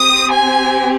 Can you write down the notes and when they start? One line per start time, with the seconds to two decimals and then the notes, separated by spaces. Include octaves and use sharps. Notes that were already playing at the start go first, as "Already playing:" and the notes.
Already playing: C4 G4 D#6
0.32 G#5